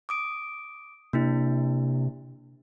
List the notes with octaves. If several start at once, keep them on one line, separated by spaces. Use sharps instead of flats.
D6 D#6 D7
C3 A#3 D4 E4